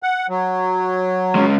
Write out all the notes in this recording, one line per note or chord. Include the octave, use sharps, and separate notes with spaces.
F#5
F#3
G#3 C#4